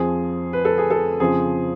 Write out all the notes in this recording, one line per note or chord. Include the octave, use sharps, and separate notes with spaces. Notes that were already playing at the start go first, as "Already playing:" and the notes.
Already playing: F2 F3 G#4
B4
A4
G#4
A4
F2 C#3 F3 G#4